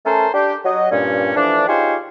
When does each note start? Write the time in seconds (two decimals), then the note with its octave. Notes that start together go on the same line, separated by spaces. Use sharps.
0.06 A3 C#4 A4 A#4 C5 A5
0.33 D4 G4
0.65 F#3 D#5
0.91 G2 A#2 C#4
1.36 E3 F3 A3 D4
1.68 D#4 F4 G4 G#4 C5 C#5